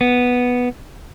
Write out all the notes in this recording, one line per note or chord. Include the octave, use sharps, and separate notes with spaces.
B3